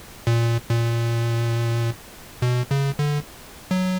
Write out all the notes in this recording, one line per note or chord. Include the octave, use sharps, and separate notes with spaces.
A#2
A#2
B2
C#3
D3
F#3